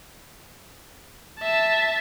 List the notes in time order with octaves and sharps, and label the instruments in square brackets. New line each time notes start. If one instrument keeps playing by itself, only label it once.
[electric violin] E5 A5